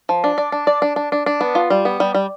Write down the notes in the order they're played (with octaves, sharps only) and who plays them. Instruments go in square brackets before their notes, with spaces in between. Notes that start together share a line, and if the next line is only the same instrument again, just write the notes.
[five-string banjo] F3
D4
D5
D4
D5
D4
D4
D4
D4
B3
F4
G3
B3
G3
G3